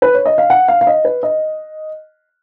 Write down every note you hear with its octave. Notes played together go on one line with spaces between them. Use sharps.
B4
C#5
D#5
F5
F#5
F5
F5
D#5
B4
D#5